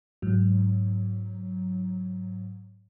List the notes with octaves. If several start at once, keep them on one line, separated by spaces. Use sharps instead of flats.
G#2 F#3